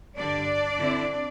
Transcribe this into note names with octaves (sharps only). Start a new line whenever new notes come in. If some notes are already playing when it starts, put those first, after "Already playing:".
G2 D3 G3 D4 D5
D3 C4 E4